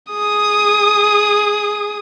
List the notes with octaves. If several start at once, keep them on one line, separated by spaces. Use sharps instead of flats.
G#4 D#6